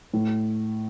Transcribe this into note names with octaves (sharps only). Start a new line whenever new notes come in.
A2